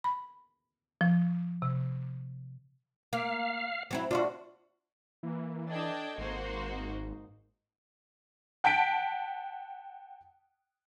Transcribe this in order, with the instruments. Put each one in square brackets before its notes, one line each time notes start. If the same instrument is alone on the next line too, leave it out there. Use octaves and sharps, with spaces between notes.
[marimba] B5
F3
C3
[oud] A#3 [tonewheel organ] F5
[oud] F#3 C4 E4
[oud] D4 D#4 F#4 [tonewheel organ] F4
[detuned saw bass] E3 [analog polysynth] A#3
[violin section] D4 G5 A5 [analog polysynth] A4 D#5 G#6
[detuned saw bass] G#1 [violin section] A#3 F#4 C5
[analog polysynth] G#2 D#4
[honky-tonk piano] F#5 G5 A5 B6 D7